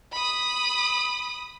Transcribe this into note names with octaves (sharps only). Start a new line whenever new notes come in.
B5 D#6